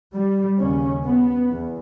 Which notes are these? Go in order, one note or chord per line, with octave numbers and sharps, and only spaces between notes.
G3
D#2 C#3 C#4
B3
E2